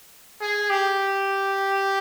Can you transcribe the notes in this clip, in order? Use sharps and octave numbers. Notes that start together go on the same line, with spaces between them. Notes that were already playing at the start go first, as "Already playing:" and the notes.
G#4
G4